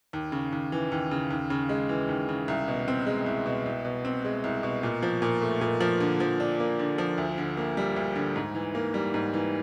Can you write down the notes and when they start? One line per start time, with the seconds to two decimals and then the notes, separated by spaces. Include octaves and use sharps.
0.13 D#2
0.32 C#3
0.52 D#2
0.72 E3
0.92 D#2
1.11 C#3
1.30 D#2
1.50 C#3
1.69 G#3
1.89 E3
2.09 D#2
2.29 C#3
2.48 C2
2.68 B2
2.88 C4
3.07 G#3
3.26 C2
3.46 B2
3.66 C2
3.85 B2
4.05 C4
4.25 G#3
4.44 C2
4.63 B2
4.83 A#2
5.03 F3
5.22 A#2
5.42 A3
5.61 A#2
5.80 F3
6.00 D3
6.20 F3
6.40 D4
6.60 A#3
6.79 D3
6.98 F3
7.18 D2
7.38 D3
7.57 A#3
7.77 G3
7.96 D2
8.16 D3
8.36 G#2
8.55 E3
8.75 A#3
8.94 G3
9.14 G#2
9.34 E3